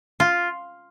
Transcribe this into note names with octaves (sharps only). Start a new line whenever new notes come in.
F4